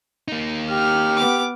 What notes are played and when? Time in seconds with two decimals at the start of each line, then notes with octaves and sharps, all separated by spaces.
0.28 A#3 D#4
0.71 G4 F6
1.17 B3 D6